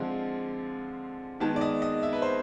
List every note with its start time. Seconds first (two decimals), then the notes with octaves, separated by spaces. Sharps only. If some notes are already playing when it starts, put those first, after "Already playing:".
Already playing: D3 F3 G#3 C4
1.40 D#3 G#3 B3 A5
1.56 D5
1.61 D#5
1.82 D#5
2.03 E5
2.13 B4
2.22 C5